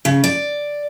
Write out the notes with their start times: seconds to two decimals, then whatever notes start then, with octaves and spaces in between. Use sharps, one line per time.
0.05 C#3
0.24 D5